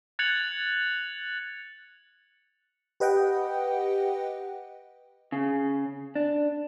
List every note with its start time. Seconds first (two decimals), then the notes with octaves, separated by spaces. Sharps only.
0.19 F#6 G#6 A6 C#7 F7 F#7
3.00 G4 B4 D#5 F#5 G5
5.32 C#3
6.15 D4